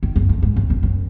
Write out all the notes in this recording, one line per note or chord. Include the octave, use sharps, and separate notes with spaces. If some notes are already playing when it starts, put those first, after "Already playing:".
D#3
F#2
F2
G#2
F#2
F2
F#2